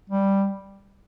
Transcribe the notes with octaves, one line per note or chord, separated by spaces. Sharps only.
G3